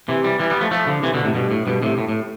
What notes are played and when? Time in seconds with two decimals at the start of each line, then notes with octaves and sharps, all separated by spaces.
0.09 C3 E3
0.24 E3 G3
0.39 E3 G3
0.50 G3 B3
0.61 F3 A3
0.71 F3 A3
0.87 D3 F3
1.03 C3 E3
1.14 B2 D3
1.24 A2 C3
1.34 G2 B2
1.51 A2
1.67 G2 B2
1.82 A2 C3
1.98 A2
2.09 A2